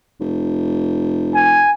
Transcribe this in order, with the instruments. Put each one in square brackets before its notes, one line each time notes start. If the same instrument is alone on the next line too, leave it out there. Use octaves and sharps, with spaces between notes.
[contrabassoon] F1
[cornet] G#5